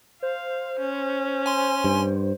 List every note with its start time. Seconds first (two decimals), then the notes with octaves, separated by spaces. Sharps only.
0.23 C5 F5
0.80 C#4
1.46 G#5 C6
1.84 G2